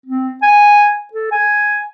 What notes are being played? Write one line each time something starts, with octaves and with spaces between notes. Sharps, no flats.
C4
G#5
A4
G#5